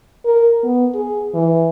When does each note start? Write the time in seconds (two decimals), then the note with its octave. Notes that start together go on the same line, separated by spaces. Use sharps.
0.25 A#4
0.63 B3
0.94 G#4
1.34 E3